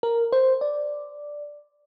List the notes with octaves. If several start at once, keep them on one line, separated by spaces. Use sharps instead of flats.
A#4
C5
D5